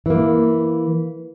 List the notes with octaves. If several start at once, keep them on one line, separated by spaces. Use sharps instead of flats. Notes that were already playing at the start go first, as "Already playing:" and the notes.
E3 A#3